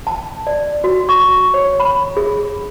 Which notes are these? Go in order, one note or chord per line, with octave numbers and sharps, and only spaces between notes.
A5
D5
F#4
C#6
C#5
B5
G#4